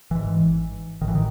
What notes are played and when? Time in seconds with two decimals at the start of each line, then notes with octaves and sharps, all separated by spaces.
0.11 G#1 G#2 E3
1.01 A1 D#3
1.04 A2 E3
1.15 D#3